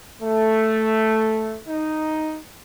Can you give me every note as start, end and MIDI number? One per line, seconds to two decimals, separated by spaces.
0.23 1.57 57
1.68 2.38 63